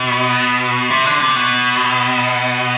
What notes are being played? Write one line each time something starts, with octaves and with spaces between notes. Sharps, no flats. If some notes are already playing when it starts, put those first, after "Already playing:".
Already playing: B2
C3
D3
C3
B2